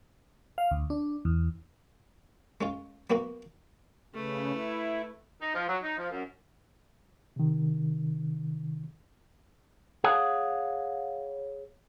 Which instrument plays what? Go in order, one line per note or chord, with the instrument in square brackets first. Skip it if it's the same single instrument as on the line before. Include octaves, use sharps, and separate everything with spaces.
[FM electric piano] F5
D2
D4
E2
[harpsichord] G#3 C#4 F4
F#3 A#3 B3 F#4 D#5
[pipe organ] C#3 [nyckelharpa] A3 B4
[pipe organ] E4
[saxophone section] D#4
F3
F#3
D#4
F3
F#2
[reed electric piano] C3 D#3
[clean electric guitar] G#4 C#5 F5 F#5